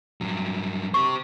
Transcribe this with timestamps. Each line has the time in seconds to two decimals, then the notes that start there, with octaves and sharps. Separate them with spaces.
0.21 G2 F#3
0.94 G4 C5 C#6